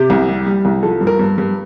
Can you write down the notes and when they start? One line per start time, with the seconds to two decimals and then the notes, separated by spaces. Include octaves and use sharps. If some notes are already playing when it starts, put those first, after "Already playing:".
Already playing: C3 G4
0.10 C2
0.28 G3
0.46 G3
0.65 C2
0.83 F3 A4
1.01 G2
1.07 A#4
1.19 G2
1.38 G2